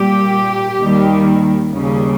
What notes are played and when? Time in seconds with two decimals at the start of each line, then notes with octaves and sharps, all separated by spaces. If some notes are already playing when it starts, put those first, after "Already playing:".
Already playing: A#2 G3 G4
0.77 D#2 D#3 G3
1.71 D#2 C#3 G3